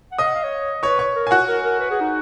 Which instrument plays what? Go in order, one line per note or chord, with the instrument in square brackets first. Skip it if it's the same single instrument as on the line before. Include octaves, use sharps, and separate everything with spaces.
[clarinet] F#5
[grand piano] D#5 D#6 [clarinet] F5
[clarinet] F#5
F5
C#5
[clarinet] B4 [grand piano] C#5 C#6
[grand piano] C#5 C#6
[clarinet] A#4
[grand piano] G#5
F#4 F#5
[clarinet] A#4
A#4
B4
G#4
D#4